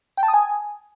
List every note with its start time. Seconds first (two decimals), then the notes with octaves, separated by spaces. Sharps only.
0.17 G5
0.23 A5
0.28 D#6
0.34 G#5